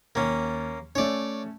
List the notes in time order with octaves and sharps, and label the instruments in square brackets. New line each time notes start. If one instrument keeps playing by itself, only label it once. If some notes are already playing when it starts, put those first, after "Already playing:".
[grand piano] D#2 [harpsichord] A#3 C#4
[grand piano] A3 C#4 [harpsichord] C#5 D5